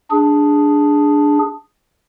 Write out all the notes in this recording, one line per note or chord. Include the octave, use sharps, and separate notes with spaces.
D4 G#4